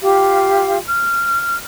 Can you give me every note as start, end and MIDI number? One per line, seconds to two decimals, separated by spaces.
0.01 0.76 65
0.01 0.76 67
0.01 0.76 77
0.86 1.61 89